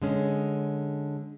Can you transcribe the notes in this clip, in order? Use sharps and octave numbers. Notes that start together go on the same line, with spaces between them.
D3 G#3 C#4